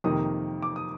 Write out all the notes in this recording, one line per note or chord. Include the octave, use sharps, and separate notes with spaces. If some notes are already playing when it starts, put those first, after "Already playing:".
F2 C3 D#3 A#3 D#4 D#6
D6
D#6